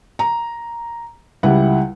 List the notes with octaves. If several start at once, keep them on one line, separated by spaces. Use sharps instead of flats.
A#5
C#2 G3 E4 F#5